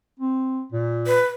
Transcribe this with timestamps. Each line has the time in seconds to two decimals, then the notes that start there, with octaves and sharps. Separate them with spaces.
0.19 C4
0.72 A#2
1.07 B4